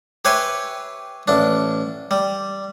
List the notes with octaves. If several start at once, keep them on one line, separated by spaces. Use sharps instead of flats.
G4 B4 C#5 E5 G#5 C6
A1 D4
G3